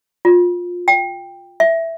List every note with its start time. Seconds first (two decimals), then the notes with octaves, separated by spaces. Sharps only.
0.25 F4
0.88 G5
1.60 E5